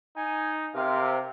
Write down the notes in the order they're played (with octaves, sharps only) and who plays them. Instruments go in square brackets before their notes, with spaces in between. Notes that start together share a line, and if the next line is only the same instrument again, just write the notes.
[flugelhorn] D#4 [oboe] G#5
[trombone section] C3 [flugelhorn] A#4 [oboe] F5